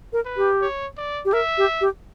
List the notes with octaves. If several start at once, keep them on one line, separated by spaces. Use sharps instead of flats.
A#4
B4
G4
C#5
D5
G4
A#4 E5
G4
G4